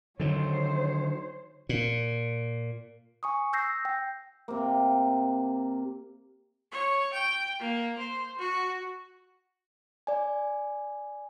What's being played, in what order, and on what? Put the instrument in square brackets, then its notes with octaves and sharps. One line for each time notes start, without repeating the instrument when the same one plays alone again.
[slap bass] D3 D#3 F#3 [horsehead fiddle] C5 C#5
[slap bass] A#2
[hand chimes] G#5 C#6 D#6
E6 G6 A#6 C7
G5
[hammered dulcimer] C3 A#3
[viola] C#5
G5
A#3
C5
F#4
[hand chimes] D5 G#5